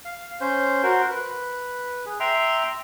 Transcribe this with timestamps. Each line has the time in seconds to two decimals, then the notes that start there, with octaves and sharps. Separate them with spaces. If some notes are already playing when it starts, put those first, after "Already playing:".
0.05 F5
0.41 C#4 C5
0.83 F#4 A#4 C5
1.11 B4
2.06 G#4
2.20 E5 G5 A#5 C6